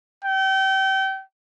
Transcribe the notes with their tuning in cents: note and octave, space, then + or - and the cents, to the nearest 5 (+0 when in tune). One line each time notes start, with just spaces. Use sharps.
G5 -30